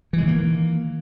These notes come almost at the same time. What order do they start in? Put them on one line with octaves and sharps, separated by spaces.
E3 G#3 D#3 A#3